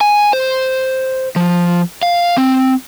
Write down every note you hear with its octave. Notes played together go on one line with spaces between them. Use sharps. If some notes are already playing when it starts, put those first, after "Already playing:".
G#5
C5
F3
F5
C4